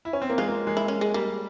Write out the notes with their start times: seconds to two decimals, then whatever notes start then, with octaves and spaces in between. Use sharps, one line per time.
0.05 E4
0.13 C#4
0.22 C4
0.29 A#3
0.38 G#3 F4
0.48 A#3
0.67 G#3
0.77 E4
0.88 C#4
1.01 G#3
1.14 G3 A#3